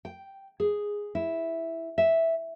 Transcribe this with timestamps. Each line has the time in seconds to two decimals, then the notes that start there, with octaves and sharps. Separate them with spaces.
0.05 G5
0.60 G#4
1.15 E4
1.98 E5